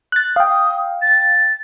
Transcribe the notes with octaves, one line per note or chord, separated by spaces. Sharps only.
F#6 A6
F5 G5 D#6
A6